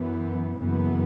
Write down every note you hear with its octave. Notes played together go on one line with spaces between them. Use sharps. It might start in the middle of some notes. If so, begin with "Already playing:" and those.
Already playing: F#2 E3 B3
F#1 F#2 E3 B3